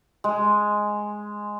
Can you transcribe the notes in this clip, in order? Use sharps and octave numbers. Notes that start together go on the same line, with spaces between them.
G#3